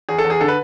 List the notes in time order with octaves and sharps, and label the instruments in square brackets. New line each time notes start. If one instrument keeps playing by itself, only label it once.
[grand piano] E2 G#4
A4
E2
G#4
D3 A4
B4